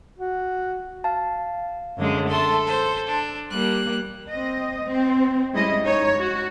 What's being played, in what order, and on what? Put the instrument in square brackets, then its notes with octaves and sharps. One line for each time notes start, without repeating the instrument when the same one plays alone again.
[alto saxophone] F#4
[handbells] F5 A5
[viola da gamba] F#2 D3 G#3
[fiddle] A3 C6 [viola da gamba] A4
[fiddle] C5
D4
[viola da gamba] G3 A#3 [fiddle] F#6
[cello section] C4 D#5
C4
G3 G#3 C#4 E4 D#5
D#4 C#5
F#4